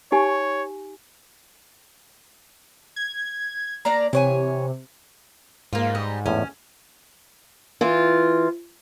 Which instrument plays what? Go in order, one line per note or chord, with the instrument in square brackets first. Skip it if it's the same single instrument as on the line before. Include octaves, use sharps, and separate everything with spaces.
[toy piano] D#4 G4 G#5 [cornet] C#5
[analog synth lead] G#6
[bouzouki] A#3 D4 D5 [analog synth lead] A#5
[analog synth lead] C3 [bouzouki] E3 C#5 G#5
[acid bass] G#2 [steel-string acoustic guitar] A#3 F4
[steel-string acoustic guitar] G3 D#5
[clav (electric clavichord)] E2 A2 [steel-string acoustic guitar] C#4
[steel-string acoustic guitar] E3 F4